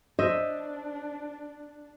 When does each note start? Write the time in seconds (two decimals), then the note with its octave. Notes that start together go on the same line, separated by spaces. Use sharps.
0.19 D4 C5 D#5 E5